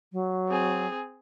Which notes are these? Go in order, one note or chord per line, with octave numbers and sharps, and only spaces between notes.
F#3
C4 G#4